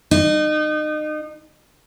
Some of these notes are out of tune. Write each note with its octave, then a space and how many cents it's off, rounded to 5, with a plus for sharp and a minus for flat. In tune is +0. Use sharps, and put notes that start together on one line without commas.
D#4 -30